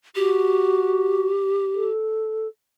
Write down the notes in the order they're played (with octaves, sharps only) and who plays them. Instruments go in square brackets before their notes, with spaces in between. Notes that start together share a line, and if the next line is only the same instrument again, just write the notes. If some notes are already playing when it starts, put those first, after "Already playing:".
[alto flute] F#4 [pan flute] G4
[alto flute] A4